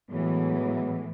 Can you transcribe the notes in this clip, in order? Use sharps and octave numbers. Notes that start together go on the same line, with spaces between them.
A2 E3 F#3 G#3 B3